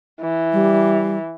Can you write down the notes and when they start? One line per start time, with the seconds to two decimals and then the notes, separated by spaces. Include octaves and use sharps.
0.22 E3
0.53 G3